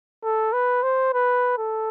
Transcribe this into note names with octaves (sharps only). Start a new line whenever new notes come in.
A4
B4
C5
B4
A4